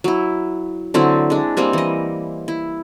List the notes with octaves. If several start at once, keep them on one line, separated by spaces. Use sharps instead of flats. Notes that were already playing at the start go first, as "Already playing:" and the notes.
F#3 E4
D3 F#3 C4 E4
G#3 D4
G3 A#3 C4 G#5
E3 D#5
E4